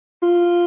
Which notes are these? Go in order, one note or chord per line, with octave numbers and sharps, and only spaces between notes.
F4